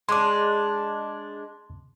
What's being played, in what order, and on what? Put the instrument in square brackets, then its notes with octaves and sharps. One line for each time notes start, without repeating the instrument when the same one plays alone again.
[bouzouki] G#3 D4 [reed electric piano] C6 D6